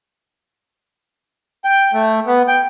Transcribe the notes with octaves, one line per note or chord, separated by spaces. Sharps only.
G5
A3
B3
G5